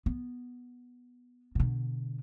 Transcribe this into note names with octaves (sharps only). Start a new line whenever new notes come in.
B3
B2 D3